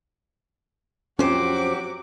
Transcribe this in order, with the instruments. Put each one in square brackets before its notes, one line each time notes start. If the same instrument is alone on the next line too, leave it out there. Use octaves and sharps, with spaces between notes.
[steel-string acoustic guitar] F2 C5 [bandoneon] F#3 G4 [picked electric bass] C#4 [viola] F#4 D6